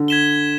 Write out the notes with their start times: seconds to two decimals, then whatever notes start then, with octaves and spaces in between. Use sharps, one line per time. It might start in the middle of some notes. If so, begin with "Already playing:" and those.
Already playing: D3
0.08 G#6 B6 E7 G7